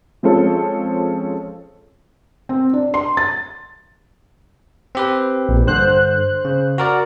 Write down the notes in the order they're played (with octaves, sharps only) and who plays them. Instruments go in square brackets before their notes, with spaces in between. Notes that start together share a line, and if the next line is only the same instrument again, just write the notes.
[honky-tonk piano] F3 G#3 C4 C#4 F4 A4
[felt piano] C4
D4
C6
A6
[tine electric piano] C4 G4 B4
[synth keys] A#1
[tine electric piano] G2 D3 [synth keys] C5 F#6
[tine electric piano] C#3
F#4 A#4 D5